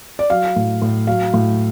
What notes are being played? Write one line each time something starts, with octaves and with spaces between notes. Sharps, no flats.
D5
F#3 F5
A2
A2
F#3 F5
A2